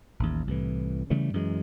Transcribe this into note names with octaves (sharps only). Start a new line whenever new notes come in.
A1 D#2
C2 A2 E3
C#3 E3 G3 A3
F#2 E3 F#3 G#3